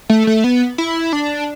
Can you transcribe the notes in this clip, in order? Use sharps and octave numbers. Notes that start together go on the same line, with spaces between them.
A3
A3
B3
E4
D4